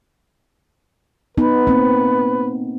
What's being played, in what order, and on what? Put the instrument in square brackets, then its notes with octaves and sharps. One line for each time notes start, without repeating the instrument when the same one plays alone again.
[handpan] B3 D#4 [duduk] B4
[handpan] A#3 C4